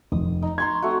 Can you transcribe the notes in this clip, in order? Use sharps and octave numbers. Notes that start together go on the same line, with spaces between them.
F1 D#6
D#4
A#5 C6 C#6 G#6
A3 C4 F#4